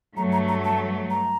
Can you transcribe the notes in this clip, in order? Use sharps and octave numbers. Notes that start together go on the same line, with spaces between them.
G2 F#3 A3 A#5
A#5
A#5
A5
A#5